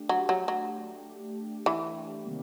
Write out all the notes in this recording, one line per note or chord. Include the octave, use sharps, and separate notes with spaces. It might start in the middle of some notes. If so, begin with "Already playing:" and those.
Already playing: A3 D4 G4
F#3
F#3
F#3
E3
C3 D#3 G3 A#3